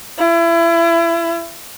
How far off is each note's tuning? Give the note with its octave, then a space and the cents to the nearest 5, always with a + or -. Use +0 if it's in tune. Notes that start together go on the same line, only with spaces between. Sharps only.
E4 +30